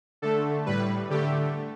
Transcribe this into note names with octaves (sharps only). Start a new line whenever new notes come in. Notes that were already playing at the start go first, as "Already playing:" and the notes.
D3 A3 A4
A2 G3 B4
D3 A3 G4